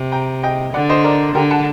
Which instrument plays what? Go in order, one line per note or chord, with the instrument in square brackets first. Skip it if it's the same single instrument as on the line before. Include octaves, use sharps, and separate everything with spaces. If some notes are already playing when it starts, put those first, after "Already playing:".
Already playing: [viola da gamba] C3
[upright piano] G5 A#5
D#5 G5
[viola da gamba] D3 [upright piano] D5 F#5
[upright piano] C5 D#5
A#4 D5
[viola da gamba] D3 [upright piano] G4 A#4
[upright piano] F#5 A5